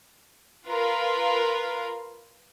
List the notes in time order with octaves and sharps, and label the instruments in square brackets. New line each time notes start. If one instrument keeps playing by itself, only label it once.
[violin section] F4 A#4 B4 F5